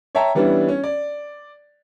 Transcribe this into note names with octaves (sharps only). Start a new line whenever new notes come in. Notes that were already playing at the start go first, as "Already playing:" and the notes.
C#5 E5 G5 A5 A#5
E3 G3 B3 C#4 D4 E4
C#4
D5